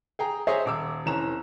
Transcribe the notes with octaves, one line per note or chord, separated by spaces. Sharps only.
G#4 G5 A#5
G#4 C5 C#5 D#5 E5
D#1 D6 E6
F1 E3 C#4 A#5 E7